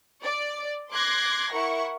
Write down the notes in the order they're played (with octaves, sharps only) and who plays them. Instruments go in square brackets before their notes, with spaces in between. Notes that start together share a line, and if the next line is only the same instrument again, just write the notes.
[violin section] D5
C6 D6 F#6 G#6 A#6 C7
E4 A#4 F#5 C#6